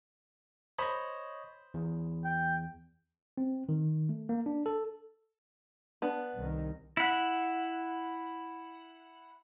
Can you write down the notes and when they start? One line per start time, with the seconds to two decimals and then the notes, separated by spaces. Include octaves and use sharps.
0.78 C5 C#5 D#5 B5 D#6
1.74 E2
2.25 G5
3.38 C4
3.69 D#3
4.09 A3
4.29 A#3
4.46 D4
4.66 A4
6.02 B3 D4
6.35 C2 D#3
6.97 E4 F#5